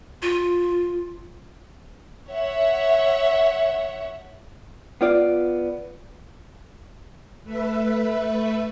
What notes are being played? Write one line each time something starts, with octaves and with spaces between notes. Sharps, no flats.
F4
C#5 E5 F#5
B3 F4 D5
A3 B4 E5